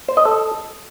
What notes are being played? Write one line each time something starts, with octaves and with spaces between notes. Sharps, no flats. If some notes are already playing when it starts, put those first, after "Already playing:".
C5
D#5
A4